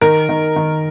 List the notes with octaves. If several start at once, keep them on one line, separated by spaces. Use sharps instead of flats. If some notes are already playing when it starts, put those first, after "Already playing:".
D#3 A#4
D#3
D#3